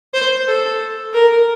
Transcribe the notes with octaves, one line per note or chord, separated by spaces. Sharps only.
C5
A4
A#4